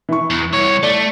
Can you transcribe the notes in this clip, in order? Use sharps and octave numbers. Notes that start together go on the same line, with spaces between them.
E3 C#6
E2
C2 C#5
A3 D5